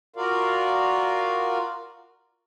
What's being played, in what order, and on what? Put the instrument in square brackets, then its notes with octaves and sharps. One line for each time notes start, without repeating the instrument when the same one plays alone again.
[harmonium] F4 F#4 A#4 D5 F5